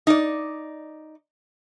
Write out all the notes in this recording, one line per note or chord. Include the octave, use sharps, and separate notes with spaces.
D#4 D5